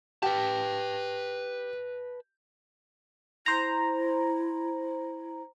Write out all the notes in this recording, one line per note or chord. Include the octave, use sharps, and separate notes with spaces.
G4 B4 A5
E4 C5 A#5